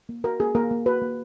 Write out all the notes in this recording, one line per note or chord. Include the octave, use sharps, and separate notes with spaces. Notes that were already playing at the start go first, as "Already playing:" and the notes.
A#3
F#4 A#4
A#3 G#4
A#3 A#4
A#3
F#4 B4
A#3